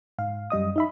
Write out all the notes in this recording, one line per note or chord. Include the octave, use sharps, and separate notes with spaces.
G#2 F5
F#2 G3 D#5 D#6
D#4 E5 B5